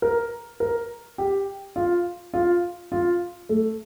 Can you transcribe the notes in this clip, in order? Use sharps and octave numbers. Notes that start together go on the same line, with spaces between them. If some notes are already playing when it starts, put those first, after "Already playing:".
A#4
A#4
G4
F4
F4
F4
A3